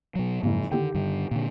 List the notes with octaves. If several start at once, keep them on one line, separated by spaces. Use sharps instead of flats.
B2 F#3
F#1 F2 G#2
D3 D#3 G4 G5
G2 D3
A#2 D3